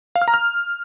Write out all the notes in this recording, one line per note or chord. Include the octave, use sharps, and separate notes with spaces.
F5
F6
A#5
F6